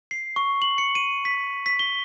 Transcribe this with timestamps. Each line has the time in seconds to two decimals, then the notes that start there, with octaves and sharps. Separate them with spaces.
0.11 C7
0.36 C#6
0.62 F#7
0.78 C#7
0.95 D#7
1.25 B6
1.66 B6
1.79 G7